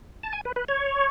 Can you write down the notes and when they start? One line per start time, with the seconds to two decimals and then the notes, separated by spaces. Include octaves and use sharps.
0.23 A5
0.33 G#5
0.45 B4
0.56 B4
0.68 C#5